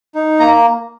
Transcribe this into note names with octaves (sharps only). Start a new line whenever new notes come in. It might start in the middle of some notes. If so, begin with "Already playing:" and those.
D#4
A#3 A#5